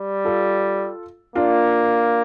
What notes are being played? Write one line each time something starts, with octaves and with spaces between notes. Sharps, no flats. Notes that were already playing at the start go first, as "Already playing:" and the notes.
Already playing: G3
F4 A4
A#3 D4 F4